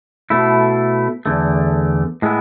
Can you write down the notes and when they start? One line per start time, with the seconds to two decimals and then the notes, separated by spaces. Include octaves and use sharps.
0.30 B2 A3 E4
1.26 E2 D3 A3
2.22 A2 G#3 B3 E4